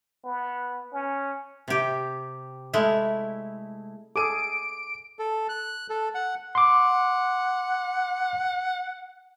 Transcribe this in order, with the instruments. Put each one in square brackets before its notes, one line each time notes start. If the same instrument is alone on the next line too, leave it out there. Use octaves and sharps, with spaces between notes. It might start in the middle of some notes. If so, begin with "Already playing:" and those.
[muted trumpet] B3
C#4
[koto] C3 G4
G#3 A3 E4
[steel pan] G#4 A4 [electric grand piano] D6 D#7 [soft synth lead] D7
[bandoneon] A4
F#6
A4
F#5
[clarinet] F#5 [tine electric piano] C6 D6